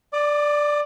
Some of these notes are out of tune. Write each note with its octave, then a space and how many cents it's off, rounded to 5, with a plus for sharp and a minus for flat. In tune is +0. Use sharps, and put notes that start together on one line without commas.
D5 +0 D6 +40